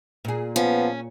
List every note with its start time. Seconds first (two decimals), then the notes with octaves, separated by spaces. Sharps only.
0.25 A#2 G#4
0.56 F3 B3 C#4